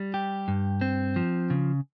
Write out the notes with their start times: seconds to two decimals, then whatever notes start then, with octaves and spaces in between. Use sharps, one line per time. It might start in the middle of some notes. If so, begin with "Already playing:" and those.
Already playing: G3
0.14 G4
0.48 G2
0.81 C4
1.16 F3
1.50 C#3